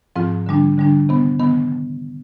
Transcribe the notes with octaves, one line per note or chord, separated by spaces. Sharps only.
G#2 F3 C4 F4
D3 G3 D4
D3 G3 D4
C3 D#3 B3
C3 D#3 B3